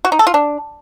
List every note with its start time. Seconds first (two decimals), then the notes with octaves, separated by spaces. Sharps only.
0.05 F#4
0.12 D#4
0.19 A4
0.27 F4
0.34 D4